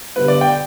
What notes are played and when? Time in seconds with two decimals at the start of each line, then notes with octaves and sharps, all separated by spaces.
0.16 D3 G3 B3 B4
0.28 D5
0.41 G5